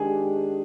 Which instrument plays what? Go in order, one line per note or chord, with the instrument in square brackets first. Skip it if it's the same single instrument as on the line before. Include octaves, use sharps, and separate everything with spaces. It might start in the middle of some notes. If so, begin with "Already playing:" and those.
Already playing: [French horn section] D#3 G#3 D4 G4 [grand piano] G#4